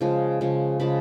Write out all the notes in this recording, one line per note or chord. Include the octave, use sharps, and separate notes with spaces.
C#3 F3 G#3
C#3 F3 G#3
C#3 F3 G#3 A5 B5